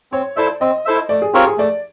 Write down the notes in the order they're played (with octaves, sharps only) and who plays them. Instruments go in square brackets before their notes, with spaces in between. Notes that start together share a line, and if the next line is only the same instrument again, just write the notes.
[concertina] C4 [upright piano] C#5
[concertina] E4 A4 C5 E5 [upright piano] D5
[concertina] C4 [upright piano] D#5
[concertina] E4 A4 C5 E5
[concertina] A3 [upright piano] D5
[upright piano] G#4
[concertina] C4 F4 A#4 C#5 [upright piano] G4
[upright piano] G#4
[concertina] A3 [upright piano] D5